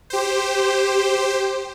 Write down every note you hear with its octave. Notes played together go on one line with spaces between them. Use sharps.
G4 C5